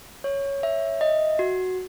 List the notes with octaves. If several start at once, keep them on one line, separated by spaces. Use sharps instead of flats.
C#5
E5
D#5
F#4